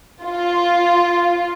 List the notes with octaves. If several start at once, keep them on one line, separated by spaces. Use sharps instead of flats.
F4